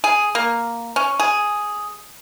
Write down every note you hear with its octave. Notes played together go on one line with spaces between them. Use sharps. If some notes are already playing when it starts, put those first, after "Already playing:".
G#4
A#3
C#4
G#4